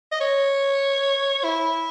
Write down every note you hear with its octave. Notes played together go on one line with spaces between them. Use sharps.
D#5
C#5
E4